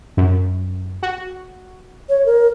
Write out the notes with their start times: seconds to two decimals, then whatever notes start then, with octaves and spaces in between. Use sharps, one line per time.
0.17 F#2
1.03 F#4
2.09 C#5
2.26 A#4